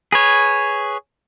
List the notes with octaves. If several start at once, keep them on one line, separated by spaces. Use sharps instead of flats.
G#4 B4 C#5